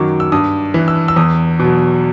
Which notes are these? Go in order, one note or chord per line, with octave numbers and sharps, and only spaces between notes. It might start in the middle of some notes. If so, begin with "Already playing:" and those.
Already playing: F#2 D#3 F#3 C#6 D6
E6
G2 D#6
E3
E6
E6
E2 D#6
B2 F#3